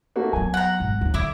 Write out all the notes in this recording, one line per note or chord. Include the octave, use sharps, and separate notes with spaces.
A3 A#3 F#4
F#3 B3 G#5
F#5 A#5
G#1
D#2 F3
D3 E4 D6